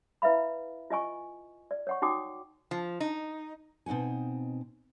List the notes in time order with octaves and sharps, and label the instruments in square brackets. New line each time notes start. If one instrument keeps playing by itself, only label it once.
[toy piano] E4 B4 E5 F5 B5
F4 D#5 G#5 C#6
D5
C#5 F#5 C#6
D#4 F#4 G5 D6 D#6
[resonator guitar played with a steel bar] F3
D#4
[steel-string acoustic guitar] B2 C4 D#4 F#5 G#5